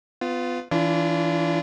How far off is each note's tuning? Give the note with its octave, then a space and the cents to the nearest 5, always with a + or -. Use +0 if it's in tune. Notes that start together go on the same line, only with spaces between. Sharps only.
B3 +30 F4 +0
E3 +0 D4 -25 F4 -30